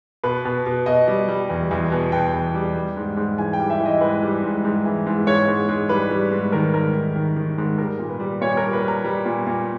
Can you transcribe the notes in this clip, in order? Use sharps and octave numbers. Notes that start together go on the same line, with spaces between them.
B2 B4
B2
B2
B2 D#5
G3
G3
E2
E2
B2
B2 G5
E2
G3
G3
G#2
G#2
E3 G#5
G5
G3
E5
E3
D#5
G#2 B4
G3
G#2
G#2
E3
G#2
G#2 C#5
G#2
G#2
G3 B4
G3
G#2
D#3 A#4
G#2 A#4
D#3
D#3
D#3
G#2
G3 A#4
A#2
B4
G3
A#2 C#5
A#4
G3
B4
G3
A#5
G3
A#2
A#2